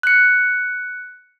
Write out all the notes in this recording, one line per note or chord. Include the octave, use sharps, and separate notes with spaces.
F#6 C#7